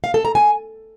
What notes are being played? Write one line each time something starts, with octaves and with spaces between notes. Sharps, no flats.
F5
A4
A#5
G#5